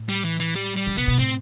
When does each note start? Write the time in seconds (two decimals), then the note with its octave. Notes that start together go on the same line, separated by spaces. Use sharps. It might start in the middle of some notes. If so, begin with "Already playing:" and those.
Already playing: A2
0.09 G3
0.25 E3
0.40 E3
0.56 G3
0.76 G3
0.87 D3
0.97 C3 B3
1.08 B2
1.18 A2 C4